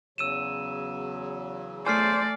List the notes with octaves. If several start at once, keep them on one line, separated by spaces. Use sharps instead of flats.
E2 C#3 F#3 E6 D#7 E7
A3 C5 D5 G#5 F6 C7